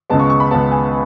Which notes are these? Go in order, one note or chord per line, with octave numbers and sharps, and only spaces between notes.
C#2 C#3 G#3 B3 A5
C#6
C#6
B5
C#2 C#3 G#3 B3 A5
G#5